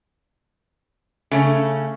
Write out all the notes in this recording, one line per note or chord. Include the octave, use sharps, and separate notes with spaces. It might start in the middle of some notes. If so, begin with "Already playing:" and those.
C#3 A3 C#4